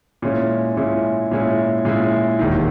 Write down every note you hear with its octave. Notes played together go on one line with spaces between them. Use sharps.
A#2 G#3 C#4 E4
A#2 G#3 C#4 E4
A#2 G#3 C#4 E4
A#2 G#3 C#4 E4
E1 D#2 D#3